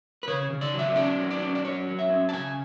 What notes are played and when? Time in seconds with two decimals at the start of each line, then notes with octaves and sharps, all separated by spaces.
0.23 B4
0.28 C#3 C#5
0.50 C#3
0.61 D5
0.73 F#3
0.79 E5
0.95 C#4 D5
1.19 F#3
1.31 D5
1.42 C#4
1.55 D5
1.65 F#3 C#5
1.88 F#3
1.99 E5
2.10 C#4
2.29 A5
2.33 C#3 G#5